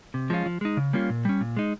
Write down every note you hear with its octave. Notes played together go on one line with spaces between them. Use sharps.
C3
F3 G#3 C#4 F4
F3
G#3 D#4
C#3
G3 A#3 C#4 F4
A#2
G3 C#4
A#2
G#3 D#4